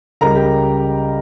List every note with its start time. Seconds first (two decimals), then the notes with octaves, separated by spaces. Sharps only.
0.21 C#2 C#3 G3 A#4 A#5
0.35 G4 G5